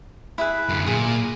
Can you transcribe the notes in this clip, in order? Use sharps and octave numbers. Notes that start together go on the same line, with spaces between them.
E4 G#4 B4
F#2 D3
A#2 G#4 D#6